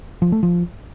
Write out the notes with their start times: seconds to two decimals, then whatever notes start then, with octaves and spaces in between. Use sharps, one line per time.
0.22 F3
0.32 A3
0.43 F3